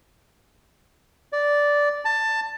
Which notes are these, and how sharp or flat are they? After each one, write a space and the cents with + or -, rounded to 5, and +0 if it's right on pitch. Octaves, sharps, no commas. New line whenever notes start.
D5 -10
A5 +15